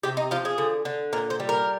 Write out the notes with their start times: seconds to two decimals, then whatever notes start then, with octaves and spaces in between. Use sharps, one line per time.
0.03 C3 G4
0.17 D#4
0.31 F3 F4
0.45 G#4
0.58 D3
0.85 D3
1.13 A#2 A#4
1.30 C5
1.40 G3
1.49 A#4